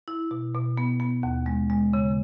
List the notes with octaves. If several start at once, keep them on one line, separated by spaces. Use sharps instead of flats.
E4
B2
B2
B3
B3
D#2
G#3
G#3
C#3